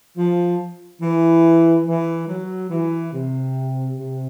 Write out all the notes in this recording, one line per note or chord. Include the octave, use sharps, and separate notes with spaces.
F3
E3
E3
F#3
E3
C3
C3